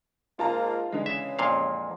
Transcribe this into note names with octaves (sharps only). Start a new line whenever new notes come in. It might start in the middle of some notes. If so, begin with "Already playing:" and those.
G#2 A#3 F4 A5 A#5
D3 E3 G#3
C#3 E5
F2 A#2 F5